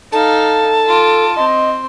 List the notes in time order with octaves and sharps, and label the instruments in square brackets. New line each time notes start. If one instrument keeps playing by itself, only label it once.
[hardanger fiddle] D#4 F5 [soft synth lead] A4 [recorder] A5
[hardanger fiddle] F4 D6
[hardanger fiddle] C4 C6 [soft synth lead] D#5